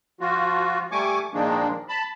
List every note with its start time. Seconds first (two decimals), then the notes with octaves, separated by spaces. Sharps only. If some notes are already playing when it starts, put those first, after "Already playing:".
0.21 F3 F4 F#4
0.92 G3 A3 G#5 C#6 D6
1.34 A#2 D#3 F3 G#3 A#3 D4
1.89 A5 B5